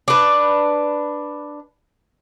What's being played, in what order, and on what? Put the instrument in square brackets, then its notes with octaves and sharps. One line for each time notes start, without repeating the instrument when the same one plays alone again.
[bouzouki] D4 B4